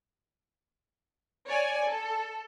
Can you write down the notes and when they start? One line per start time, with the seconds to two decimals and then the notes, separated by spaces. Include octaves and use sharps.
1.47 C#5 D5 G#5
1.88 A4